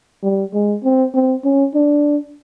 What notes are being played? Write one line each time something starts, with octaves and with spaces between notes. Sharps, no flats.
G3
G#3
C4
C4
C#4
D4